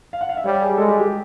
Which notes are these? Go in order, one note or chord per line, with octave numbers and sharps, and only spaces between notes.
F5
F#5
F5
E5
G3 C#5
G#4
G#3 A4
G4
G4